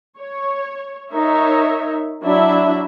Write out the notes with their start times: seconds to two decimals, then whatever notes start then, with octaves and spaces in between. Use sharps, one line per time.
0.19 C#5
1.12 D#4 A#4 C#5 E5
2.24 F#3 D4 E4 E5